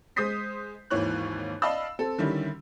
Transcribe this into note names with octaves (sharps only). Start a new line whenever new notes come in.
G#3 C5 D#6 G6 B6 C7
G#1 D#2 E3 C#5 F#6
D5 D#5 F5 A5 B5 E6
C4 A4
D3 D#3 G3 C#4 E4